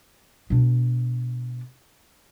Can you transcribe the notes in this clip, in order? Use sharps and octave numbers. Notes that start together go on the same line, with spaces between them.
B2 D4